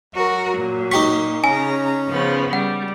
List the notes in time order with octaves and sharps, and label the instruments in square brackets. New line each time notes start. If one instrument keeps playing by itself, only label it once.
[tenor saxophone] F#3 [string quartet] F#4 A#4
[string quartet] A#2
[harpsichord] D#4 G4 C#6 [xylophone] B6
[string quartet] C#3 A#5 [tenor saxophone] C#4 [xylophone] G#5
[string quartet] C#3 F3 B3
[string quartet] G3 [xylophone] F#5